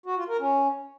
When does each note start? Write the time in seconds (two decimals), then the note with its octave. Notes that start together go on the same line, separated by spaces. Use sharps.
0.06 F#4
0.17 F4
0.28 A#4
0.40 C#4